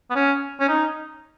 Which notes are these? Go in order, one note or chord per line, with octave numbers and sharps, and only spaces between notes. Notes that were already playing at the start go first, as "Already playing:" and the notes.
B3
C#4
C#4
D#4